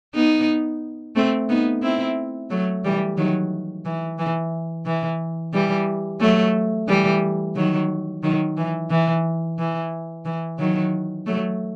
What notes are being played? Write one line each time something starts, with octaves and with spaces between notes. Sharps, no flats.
B3 D#4
A3 C4
B3 D#4
C4 E4
F#3 A3
E3 G3
D#3 F#3
E3
E3
E3
E3 G3
F#3 A3
E3 G3
D#3 F#3
D#3 F#3
E3
E3
E3
E3
D#3 F#3
F#3 A3